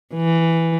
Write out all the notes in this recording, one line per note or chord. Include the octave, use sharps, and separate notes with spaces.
E3